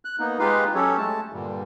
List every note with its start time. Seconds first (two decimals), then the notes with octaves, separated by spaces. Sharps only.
0.05 F#6
0.20 A#3 B3 D#4
0.39 G#3 D#4 F4 G4 B4 F5
0.75 F#3 C#4 G4 A4 C#5
0.97 G#3 A3 A5
1.33 G2 A#2 D3 G3